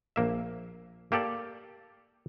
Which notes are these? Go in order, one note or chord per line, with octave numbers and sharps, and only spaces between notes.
A#1 A#3 E5
A#3 G4 A4 D5